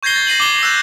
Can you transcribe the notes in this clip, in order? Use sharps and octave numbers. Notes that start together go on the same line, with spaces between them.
C#6 G6 G#6 A#6 C7 G7
A6
A#6 C7 D#7 F#7
D6 G7
E6 F#6 G6 A6